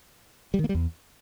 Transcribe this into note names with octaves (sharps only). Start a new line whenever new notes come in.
G3
D#3
A#3
G3
E2